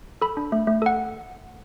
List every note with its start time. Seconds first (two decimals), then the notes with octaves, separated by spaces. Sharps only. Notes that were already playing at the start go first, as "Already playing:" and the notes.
0.22 A4 B5
0.37 D4
0.52 A3
0.67 A3
0.82 A4 F#5